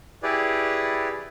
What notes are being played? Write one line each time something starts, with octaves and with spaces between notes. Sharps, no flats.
E4 G4 G#4 B4 D5